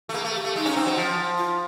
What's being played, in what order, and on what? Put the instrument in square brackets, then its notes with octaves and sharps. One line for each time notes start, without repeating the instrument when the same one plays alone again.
[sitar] A3
[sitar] A#3 [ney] G#4
[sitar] A3
[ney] G4
[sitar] A3
[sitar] G#3 [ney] D#4
[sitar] C#4
C4
F#3
F3
[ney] F4